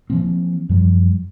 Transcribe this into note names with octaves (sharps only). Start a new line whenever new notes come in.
E3 F3 A#3 C4
F#2 F3 G3